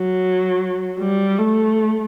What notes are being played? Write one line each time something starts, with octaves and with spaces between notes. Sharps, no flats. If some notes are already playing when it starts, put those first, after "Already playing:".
Already playing: F#3
G3
A3